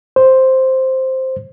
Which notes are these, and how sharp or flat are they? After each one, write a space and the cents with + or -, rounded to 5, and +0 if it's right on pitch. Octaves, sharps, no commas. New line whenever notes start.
C5 +0